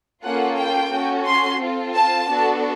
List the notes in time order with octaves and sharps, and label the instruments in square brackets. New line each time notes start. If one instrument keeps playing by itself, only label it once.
[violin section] A#3 C#4 F4 A4 F#5
G5
C#4 F#4 A4
C6
C4 F4 A4
A5
B3 D4 F#4 A4